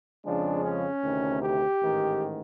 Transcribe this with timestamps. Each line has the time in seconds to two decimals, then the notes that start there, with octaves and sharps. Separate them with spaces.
0.25 F2 C#3 F3 G#3 D4
0.64 C#4
1.02 D2 C3 D#3
1.42 G4
1.80 A1 G#2 D#3